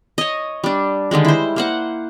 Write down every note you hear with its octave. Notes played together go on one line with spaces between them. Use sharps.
C#5 D#5
G3 D4
D3 D#3 G3 G#3
E4 C5
A#3 C5 F#5